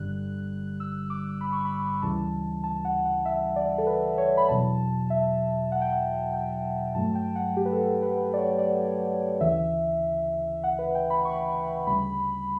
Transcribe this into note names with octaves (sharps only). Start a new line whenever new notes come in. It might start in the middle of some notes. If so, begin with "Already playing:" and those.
Already playing: G1 G2 D3 G3 F#6
E6
D6
B5
C#6
B5
D2 C#3 E3 G3 A5
A5
F#5
F#5
E5
D5
A4
B4
C#5
B5
E2 B2 F#3 A5
E5
F#5
G5
F#5
G5
G2 F#3 A3 A5
G5
F#5
G4
B4
A4
A4
B4
B4
D5
C#5
D5
D2 C#3 E3 E5
F#5
B4
G5
B5
C#6
D2 C#3 G3 B5